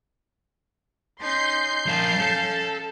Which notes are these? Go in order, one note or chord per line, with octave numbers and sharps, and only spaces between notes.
C#4 D#4 C6 G6 C7
F3 C#4 A#4 F5 A5
A4